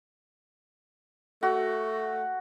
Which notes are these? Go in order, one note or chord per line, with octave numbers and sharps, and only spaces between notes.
A3 F#4